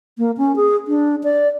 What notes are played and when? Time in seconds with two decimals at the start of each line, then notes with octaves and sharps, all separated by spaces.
0.18 A#3
0.38 C#4
0.56 G#4
0.88 D4
1.24 D5